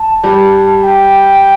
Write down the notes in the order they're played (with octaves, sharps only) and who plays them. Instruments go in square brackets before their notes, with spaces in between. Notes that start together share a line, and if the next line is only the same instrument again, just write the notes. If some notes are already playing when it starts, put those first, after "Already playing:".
Already playing: [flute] A5
[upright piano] G3
[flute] G5